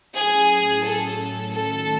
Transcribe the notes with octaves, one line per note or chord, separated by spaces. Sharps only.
A2 F#3 C#4 G#4
A4
D#3 A3 C#4 F#4 A4